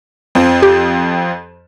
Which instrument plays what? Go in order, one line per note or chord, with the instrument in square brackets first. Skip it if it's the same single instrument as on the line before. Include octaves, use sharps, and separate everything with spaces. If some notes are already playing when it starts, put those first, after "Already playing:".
[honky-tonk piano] F2 F3 C4
[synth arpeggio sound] G4